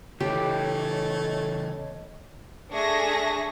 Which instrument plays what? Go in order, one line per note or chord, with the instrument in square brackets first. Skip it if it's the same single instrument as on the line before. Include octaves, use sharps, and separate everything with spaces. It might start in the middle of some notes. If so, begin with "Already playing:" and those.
[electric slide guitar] C#3 E3 [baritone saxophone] A3 [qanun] G4 [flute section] C#5 D#5
[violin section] A3 D4 G#4 E5 C#6 A#6